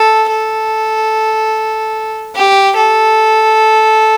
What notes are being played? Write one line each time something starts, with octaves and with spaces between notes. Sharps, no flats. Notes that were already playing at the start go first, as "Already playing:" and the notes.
Already playing: A4
A4
G4
A4